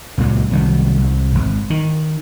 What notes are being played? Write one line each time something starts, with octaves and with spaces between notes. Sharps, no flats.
C#2 A#2 F#3
C2 D#3 F#3
C2
G#1
D#3